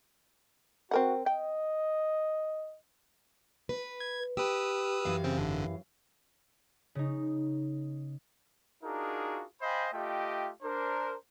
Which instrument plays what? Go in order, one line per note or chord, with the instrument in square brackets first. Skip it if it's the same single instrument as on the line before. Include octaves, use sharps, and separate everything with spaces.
[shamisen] C4 A#4 F#5 [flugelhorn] F#4
[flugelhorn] D#5 [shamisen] G5
[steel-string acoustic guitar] B4
[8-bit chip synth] G#6
[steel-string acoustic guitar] G4 [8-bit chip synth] B4 D#6 E6
[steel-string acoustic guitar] F#2 E3 F5
[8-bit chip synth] C#3 C4
G#1 D3
[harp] C#3 D#4
[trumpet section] D4 D#4 F4 F#4 G#4 A#4
C5 D#5 F5 G5 G#5 B5
A3 F4 G4 D#5 G5
D4 A#4 C5